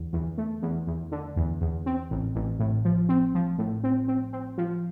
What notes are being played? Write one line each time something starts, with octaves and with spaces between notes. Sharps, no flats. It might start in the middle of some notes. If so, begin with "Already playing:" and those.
Already playing: E2 D3
E2
A3
E2
E2
D3
E2
E2
C4
A1
A1
A2
F3
C4
F3
A2
C4
C4
C4
F3